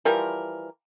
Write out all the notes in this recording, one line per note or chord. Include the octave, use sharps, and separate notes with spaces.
E3 F3 G3 A#4